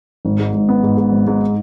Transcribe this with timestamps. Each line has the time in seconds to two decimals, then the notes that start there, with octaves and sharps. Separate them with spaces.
0.25 G#1
0.39 G#2
0.54 G#2
0.69 B3
0.83 G#2
0.97 G#2
1.12 G#1
1.27 G#2